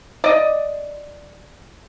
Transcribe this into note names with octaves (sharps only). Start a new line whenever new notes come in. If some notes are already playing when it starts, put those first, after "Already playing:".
D5 D#5